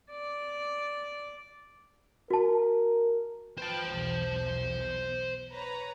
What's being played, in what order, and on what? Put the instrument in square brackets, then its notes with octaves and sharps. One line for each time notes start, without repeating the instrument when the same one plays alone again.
[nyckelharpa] D5
[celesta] F#4 A5 [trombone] A#4
[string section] B4 G5 [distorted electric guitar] C5 A5
[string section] B1 E2
B4 C#5 A#5